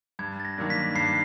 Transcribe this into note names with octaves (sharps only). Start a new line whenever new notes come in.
G2 G#6
A6
A#6
D#3 F#3 A#3 D4
B6
G2 C7